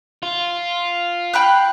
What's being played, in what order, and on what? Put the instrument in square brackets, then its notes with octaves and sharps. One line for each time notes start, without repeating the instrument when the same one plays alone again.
[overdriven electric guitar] F4
[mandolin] G5 B5 F#6